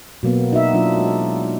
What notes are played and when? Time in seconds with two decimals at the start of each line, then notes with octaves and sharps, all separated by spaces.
0.23 B2 F#3 A#3 B3
0.53 D#4 F#4 E5
0.74 F#3 D4 F4
0.98 G#3
1.43 D#4